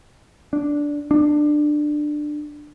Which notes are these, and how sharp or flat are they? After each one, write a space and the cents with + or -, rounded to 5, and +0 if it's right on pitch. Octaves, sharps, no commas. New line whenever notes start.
D4 -10
D4 +20